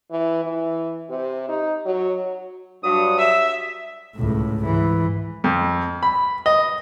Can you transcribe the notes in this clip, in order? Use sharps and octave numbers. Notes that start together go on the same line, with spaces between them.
E3
E3
C3
D#4
F#3
G2 F#3 D#6
E5 E6
C#2 A2
G#2 E3
F2
B5
D#5